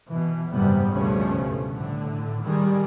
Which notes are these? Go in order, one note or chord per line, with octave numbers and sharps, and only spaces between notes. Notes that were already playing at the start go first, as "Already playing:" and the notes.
B2 E3
F#1 D#2 G#2 C3 G3 B3
C#2 G2 B2 F3 A3 C#4
A2 D3
D#3 G3 G#3